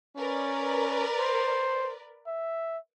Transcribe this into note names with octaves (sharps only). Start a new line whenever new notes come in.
C#4 A#4 B4 D5
C5
E5